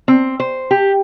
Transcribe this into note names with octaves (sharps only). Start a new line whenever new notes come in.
C4
C5
G4